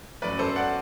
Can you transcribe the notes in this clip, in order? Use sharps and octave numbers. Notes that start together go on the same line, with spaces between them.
F#2 F#3 A3 B4 D5
A4 C5
D5 F#5